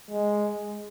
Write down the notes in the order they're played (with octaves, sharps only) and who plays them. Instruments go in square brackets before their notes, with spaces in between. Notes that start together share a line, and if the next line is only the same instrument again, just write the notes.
[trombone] G#3